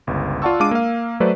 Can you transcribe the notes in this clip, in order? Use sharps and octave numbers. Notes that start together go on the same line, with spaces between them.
G1 C#2
F4 D5 F#5 A5 C#6 E6
G#3 D4 F5 D6 D#7
A#3 F5
F#3 A3 B4 C5 D5